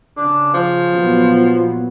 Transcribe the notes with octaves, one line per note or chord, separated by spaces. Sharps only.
C#3 D4
F3
A#2 F#3 B3